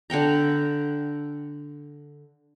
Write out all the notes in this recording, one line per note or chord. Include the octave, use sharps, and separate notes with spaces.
D3 F#5 G5 A#5